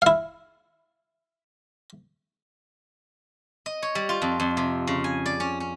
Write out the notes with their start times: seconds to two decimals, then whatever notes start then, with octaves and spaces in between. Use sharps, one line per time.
0.02 E4 F5
3.66 D#5
3.82 C#5
3.95 G3
4.09 F4
4.22 F2
4.40 F2
4.57 C3
4.87 C#3
5.04 G#5
5.26 D5
5.40 C#4
5.60 C#4